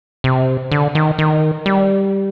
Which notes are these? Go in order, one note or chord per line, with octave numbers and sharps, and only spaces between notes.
C3
D3
D#3
D#3
G3